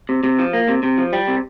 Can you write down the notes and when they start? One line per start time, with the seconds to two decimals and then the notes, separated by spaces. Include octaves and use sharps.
0.09 C3
0.24 C3
0.39 F3
0.53 A#3
0.69 C3
0.83 C3
0.98 F3
1.13 G3
1.28 C3